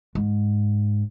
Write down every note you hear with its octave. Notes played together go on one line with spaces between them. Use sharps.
G#2